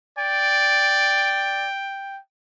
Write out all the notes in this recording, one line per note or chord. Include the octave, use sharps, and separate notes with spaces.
D5 G5